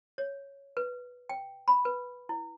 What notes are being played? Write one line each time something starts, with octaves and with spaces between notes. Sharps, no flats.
C#5
B4
G5
B5
B4
E4